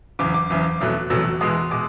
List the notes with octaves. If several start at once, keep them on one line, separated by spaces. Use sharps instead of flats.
F#1 E2 C#3 D6
D6
F#1 E2 C#3
F1 E2 B2 F#3 A3
F1 E2 B2 F#3 A3 E6
E2 B2 G#3 D#6
B2 G#3 D6